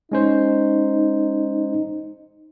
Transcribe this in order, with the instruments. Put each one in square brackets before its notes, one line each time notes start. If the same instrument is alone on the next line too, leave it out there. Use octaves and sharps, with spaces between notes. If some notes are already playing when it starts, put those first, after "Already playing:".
[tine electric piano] G#3 C#4 C5 [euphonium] D#4